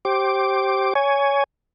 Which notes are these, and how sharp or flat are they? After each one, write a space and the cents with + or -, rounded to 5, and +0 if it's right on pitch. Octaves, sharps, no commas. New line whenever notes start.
G4 -15 C5 +20 D6 +0
C#5 +15 G#5 +0